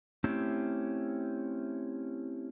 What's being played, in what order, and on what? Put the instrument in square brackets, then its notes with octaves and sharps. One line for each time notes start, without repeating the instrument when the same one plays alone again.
[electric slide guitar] A3 C4 C#4 E4 G4